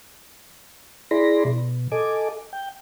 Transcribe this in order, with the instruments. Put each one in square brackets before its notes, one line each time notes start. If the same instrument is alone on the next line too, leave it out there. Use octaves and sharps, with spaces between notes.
[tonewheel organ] E4 G#4 D5 B5 C6 A#6
B2
A4 D#5 G#5 D6
G5